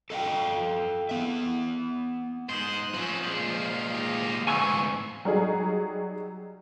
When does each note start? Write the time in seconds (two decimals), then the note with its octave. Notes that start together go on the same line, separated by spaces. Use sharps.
0.10 A4 D#5 F5 G5
1.09 B3 E5
2.49 G#2 C5 D#6 F#6
2.94 F3 C4 C#4
3.24 A#2 G#3
3.55 F5
3.95 D#4 G4
4.47 D2 G#2 E3 C4 G#5 C#6 E6
5.25 F#3 G3 D#4 G#4